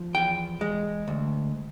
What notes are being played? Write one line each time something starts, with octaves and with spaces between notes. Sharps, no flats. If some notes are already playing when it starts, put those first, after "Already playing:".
Already playing: F3
E2 G5
G#3
D2